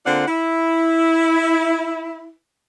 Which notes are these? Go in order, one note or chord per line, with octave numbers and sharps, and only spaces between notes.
D3 A#3 C4 F4 D5 F#5
E4